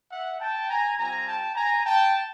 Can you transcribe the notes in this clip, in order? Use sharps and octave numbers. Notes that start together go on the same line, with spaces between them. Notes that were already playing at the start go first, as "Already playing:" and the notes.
E5 F#5
G5 A5
G#5 A#5
G3 C4 F4 G#5 A#5
G5 A5
G#5 A#5
G5 A5